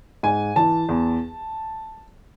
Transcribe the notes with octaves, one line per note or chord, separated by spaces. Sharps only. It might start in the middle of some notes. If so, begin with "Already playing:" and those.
G#2 G#5
E3 A5
E2